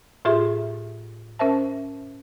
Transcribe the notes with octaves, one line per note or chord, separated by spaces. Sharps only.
A2 F4 G4 G#4 E5 C6
C#4 A#4 C5 E5 A5